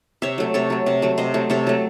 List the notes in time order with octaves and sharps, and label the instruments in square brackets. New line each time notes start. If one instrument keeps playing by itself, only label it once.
[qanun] C3 C#5 E5
F#3 A3
C3 A4 C#5
F#3 A3
C3
F#3 A3
C3 C5 D#5
F#3 A3
C3 A4 C#5
F#3 A3